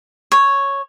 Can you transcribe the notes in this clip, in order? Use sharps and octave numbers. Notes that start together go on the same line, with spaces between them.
C#5